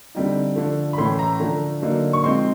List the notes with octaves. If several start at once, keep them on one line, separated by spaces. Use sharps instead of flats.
D3 G3 C4 D#4
D3 F3 A3
B5
A2 E3 A3 C#4 C6
A#5
D3 F3 A3
D3 F#3 A#3 D#4
C#6
F3 G#3 C4 D#4 C6